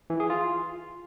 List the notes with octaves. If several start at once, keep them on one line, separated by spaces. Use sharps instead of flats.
E3
G#4
F4